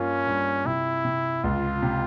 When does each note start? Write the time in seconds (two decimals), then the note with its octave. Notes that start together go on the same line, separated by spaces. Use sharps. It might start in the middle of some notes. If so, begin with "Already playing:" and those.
Already playing: G2 A#3 C#4 F4
0.27 G2
0.65 C3 E4
1.05 C3
1.44 C#2 F4
1.82 C3